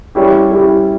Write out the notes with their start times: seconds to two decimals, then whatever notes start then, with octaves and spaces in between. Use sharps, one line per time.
0.15 G3 C#4 E4 G4
0.51 G3 C#4 E4 G4